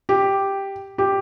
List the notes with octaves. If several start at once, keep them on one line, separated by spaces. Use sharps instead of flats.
G4
G4